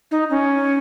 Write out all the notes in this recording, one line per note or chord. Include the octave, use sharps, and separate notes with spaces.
D#4
C#4